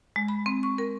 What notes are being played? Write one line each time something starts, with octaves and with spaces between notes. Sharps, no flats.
G#3
B5
C4
C#6
A#4